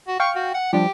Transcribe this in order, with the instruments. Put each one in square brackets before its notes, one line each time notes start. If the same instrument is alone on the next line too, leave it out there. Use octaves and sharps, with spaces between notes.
[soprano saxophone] F#4
[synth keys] F5 G5 [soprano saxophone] C#6
[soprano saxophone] F#4
F#5
[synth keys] F3 G3 D4 [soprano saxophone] G4